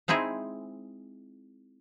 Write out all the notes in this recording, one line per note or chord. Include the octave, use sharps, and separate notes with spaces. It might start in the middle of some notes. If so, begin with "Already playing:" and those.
G#3 C4 D#4 E4 G#4